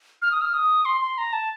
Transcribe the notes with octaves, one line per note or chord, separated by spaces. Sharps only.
F6
D#6
F6
D#6
C6
C6
A#5
A5